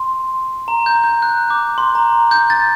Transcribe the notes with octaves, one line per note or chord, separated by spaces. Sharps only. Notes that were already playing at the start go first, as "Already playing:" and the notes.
Already playing: C6
A#5
G6
G6
F#6
D6
C6
A#5
G6
A6